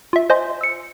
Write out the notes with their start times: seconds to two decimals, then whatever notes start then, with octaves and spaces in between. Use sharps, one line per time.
0.13 F4 E5
0.30 C5 D#5 G#5 C6
0.61 E6 C#7